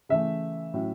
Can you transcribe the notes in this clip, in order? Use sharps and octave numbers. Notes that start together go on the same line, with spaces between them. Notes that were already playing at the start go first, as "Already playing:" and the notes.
C#3 E3 A3 E5
A2 F#3 C#4